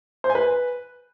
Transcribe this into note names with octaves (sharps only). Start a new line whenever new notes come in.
C5
G#5
B4